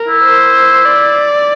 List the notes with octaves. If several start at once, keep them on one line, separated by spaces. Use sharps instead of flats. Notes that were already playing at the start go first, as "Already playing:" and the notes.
Already playing: A#4
E4
C5
D5